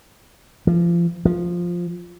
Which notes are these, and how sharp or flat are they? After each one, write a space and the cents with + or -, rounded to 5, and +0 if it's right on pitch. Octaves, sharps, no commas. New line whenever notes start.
F3 -30
F3 +5